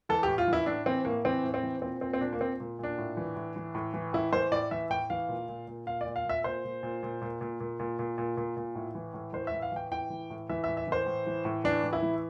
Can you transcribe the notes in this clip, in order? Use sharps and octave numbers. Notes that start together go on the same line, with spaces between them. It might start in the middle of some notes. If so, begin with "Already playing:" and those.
E3 A4
A2 G4
F4
E3
E4
A2 D4
E3 C4
A2 A#3
E3 C4
A2
C4
E3
A#2 C4
A#2 C4
C4
A#2 D4
A#3
A#2 C4
A#2
A#2 D4
A2
E3
A2
E3
A2
E3
A2 E4
E3 C5
A2 D5
E3 E5
A2 G5
E3 F5
A#2
A#2
A#2
A#2 F5
D5
A#2
F5
A#2 E5
A#2 C5
A#2
A#2
A#2
A#2
A#2
A#2
A#2
A#2
A#2
A#2
A#2
A2
E3
A2
E3 C5
E5
A2
F5
E3 G5
A2 G5
E3
A2
E3 E5
A2 E5
E5
E3 C5
A2
E3
A2
E3 D4
A2
E4
E3